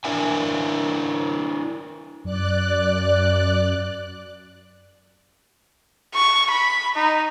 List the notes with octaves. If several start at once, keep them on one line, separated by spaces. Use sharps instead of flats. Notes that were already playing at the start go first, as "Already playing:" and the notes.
D4 E4 A#4 E5 G#5
F#2 D5 F#6
C#6
B5
D#4